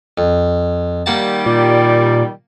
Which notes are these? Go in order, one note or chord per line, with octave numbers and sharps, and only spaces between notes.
F2
D#3 G3 A#3 F#5 A5
A#2 D5